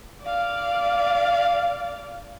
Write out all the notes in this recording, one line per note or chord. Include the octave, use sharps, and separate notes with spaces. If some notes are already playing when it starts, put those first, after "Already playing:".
D5 F5